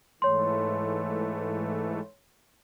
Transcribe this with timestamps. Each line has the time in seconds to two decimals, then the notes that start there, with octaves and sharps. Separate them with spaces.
0.22 G#2 E3 A3 C#5 C6